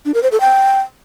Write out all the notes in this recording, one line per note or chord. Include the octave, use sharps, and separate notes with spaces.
D4
A#4
C5
A4
G5